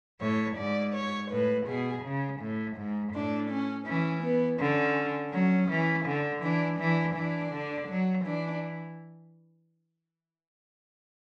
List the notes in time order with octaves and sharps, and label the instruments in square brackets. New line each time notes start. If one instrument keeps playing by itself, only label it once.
[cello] A2 [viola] C#5
[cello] G#2 [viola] D5
[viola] C#5
[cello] A2 [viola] B4
[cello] B2 [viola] G#4
[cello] C#3
A2
G#2
[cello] A2 [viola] D4
[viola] C#4
[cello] E3 [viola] C#4
[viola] B3
[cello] D3 [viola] C#4
[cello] F#3 [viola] C#4
[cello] E3
D3
[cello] E3 [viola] D4
[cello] E3 [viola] D4
[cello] E3 [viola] D4
[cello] D3
F#3
[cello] E3 [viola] D4